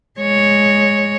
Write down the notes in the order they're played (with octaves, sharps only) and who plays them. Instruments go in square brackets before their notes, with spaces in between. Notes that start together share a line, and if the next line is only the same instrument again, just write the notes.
[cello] G#3 C#5